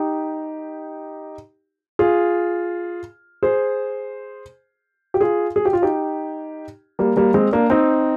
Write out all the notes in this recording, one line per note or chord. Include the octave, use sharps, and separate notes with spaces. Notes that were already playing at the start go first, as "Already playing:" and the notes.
Already playing: D#4 G4
F4 G#4
G#4 C5
G4
F4 G#4
G#4
G4
F4
D#4 G4
G3 A#3
G3 A#3
G#3 C4
A#3 D4
C4 D#4